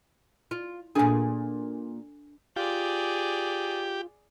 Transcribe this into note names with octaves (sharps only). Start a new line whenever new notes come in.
F4
A#2 D4 G#4 A4 G#5
F4 G4 G#4 D5